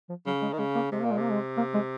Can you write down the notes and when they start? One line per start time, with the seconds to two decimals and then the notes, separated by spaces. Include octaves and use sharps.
0.09 F3
0.26 C#3 F#3
0.42 G#3
0.53 D#3
0.58 C#3 G#3
0.75 A#3
0.92 C3 G#3
1.01 A#2 A#3
1.11 G#3
1.18 C3 A#3
1.31 G#3
1.57 A#3
1.74 G#3